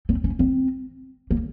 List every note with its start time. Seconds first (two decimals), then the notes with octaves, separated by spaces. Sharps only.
0.09 C4
0.24 C#4
0.39 C4
1.31 A#3